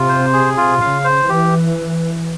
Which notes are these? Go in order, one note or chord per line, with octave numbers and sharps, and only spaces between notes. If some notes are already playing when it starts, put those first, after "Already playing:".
Already playing: C3 F4
C5
G#4
F4
C#3 F5
C5
E3 G4